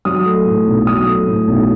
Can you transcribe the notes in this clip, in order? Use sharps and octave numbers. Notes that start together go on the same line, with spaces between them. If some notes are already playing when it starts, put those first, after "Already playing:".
F#3 D#6
A3
A2
B1
F#3 D#6
A3
A2
B1